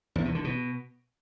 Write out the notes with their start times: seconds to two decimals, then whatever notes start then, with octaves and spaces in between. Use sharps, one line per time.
0.16 E2
0.25 B2
0.35 D3
0.44 B2